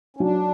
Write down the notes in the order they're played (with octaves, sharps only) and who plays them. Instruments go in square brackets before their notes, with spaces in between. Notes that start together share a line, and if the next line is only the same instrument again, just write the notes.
[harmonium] C#4
[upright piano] F#3 [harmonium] D4